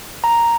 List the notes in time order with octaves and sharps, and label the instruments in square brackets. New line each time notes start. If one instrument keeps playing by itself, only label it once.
[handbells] A#5